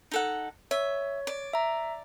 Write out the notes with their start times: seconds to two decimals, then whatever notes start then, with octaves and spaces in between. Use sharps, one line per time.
0.11 D#4 A4 F#5
0.71 C#5 E5
1.27 D5
1.53 E5 A#5